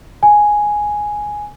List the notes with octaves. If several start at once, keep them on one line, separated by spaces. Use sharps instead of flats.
G#5